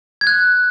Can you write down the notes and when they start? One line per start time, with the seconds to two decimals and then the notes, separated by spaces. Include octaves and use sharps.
0.21 G#6
0.27 F#6